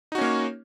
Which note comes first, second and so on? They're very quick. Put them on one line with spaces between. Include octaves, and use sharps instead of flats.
D#4 F#4 C#4 A#3 C#5